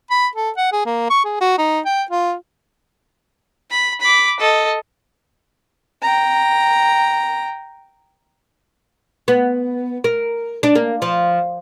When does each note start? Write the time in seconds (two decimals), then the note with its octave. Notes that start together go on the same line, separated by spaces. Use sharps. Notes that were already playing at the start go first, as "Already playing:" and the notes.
0.10 B5
0.35 A4
0.57 F#5
0.72 G#4
0.86 A#3
1.10 C#6
1.25 G#4
1.41 F#4
1.58 D#4
1.86 G5
2.11 F4
3.70 B5
4.00 B5 D6
4.40 A4 D#5
6.02 G5 A#5
9.28 B3
10.04 A#4
10.63 D4
10.75 A#3
11.02 F3